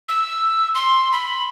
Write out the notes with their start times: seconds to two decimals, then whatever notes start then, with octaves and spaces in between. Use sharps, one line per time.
0.09 E6
0.75 C6
1.12 B5